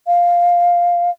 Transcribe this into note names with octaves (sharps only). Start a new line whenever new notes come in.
F5